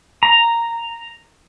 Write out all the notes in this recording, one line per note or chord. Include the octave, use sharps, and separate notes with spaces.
A#5